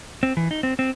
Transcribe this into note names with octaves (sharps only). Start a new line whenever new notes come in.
C4
E3
D#4
C4
C4